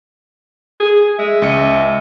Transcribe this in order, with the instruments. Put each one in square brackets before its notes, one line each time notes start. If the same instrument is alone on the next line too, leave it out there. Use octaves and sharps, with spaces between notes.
[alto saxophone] G#4
[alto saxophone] G#3 [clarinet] E5
[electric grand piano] C#2 C#7 [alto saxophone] D#5